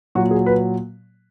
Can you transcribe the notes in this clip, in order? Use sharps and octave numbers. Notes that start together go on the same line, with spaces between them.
A#2 F#3 F#4
G#4
B4